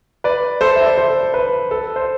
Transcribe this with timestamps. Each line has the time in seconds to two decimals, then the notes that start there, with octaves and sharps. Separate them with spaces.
0.24 B4 D5
0.61 A4 C5
0.76 E5
0.86 D5
0.98 A4 C5
1.34 B4
1.71 A4
1.96 C5